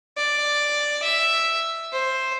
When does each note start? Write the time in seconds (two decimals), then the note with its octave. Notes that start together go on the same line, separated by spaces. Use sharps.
0.17 D5
1.02 E5
1.92 C5